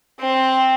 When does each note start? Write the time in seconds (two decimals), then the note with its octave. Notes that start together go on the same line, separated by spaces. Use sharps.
0.20 C4